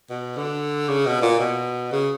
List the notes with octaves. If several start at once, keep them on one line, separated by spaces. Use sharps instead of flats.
B2
D3
C#3
B2
A#2
B2
C#3